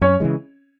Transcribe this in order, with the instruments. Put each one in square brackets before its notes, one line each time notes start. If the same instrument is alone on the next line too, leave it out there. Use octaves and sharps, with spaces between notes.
[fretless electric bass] F#2 [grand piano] C#4 C#5
[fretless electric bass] C#3 E3 G#3